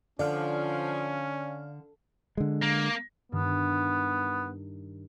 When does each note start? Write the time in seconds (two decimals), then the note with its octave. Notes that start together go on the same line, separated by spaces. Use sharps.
0.19 D3 F3 C#4 D5 F5 F6
2.37 D3 G#3
2.62 A#3
3.32 G2 D#3 B3